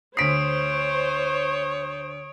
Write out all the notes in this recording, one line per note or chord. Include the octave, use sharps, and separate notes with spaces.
D2 C5 C#5 D#6 B6 C7 D7